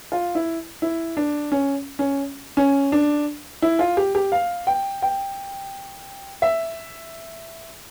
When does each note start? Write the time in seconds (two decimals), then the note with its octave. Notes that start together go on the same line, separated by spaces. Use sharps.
0.12 F4
0.35 E4
0.82 E4
1.17 D4
1.52 C#4
1.99 C#4
2.57 C#4
2.92 D4
3.62 E4
3.79 F4
3.97 G4
4.15 G4
4.32 F5
4.67 G5
5.02 G5
6.42 E5